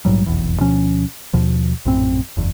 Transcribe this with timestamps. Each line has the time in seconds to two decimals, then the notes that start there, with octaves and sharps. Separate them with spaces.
0.05 A#1 G#2 F#3 G3
0.26 F1 B1 E2
0.60 D2 B2 F3 C#4
1.33 D#2 B2 F3
1.85 A#1 F#2 A2 C4
2.37 F#1 E2